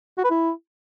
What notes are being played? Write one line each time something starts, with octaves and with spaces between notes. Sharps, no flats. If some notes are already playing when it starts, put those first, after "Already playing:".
F#4
B4
E4